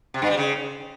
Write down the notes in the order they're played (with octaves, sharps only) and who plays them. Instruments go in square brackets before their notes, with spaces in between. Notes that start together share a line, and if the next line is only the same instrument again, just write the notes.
[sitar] C3
G2
G3
C#3